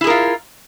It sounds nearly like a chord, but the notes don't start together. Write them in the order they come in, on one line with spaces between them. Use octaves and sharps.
E4 G#4 A#4 F4